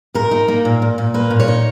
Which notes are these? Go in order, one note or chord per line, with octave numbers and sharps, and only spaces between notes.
A#2 A#4
D#4
A#3
A#2
A#2
A#2
A#3 B4
A#2
C#5
D#4